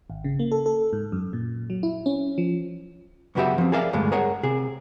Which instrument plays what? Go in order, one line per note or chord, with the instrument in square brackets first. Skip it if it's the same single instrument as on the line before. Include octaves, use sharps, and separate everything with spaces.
[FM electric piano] G#1
C#3
A#3
A4
A4
G#2
F#2
A#2
F#3
E4
C#4
F3
[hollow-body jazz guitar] F#2 C#3 B3 F#4 G4 E5
F3 C4
G#4 A#4 D5 E5 F5
D2 G2 G#3 A3
G#4 A#4 C#5 F#5
C3 G#4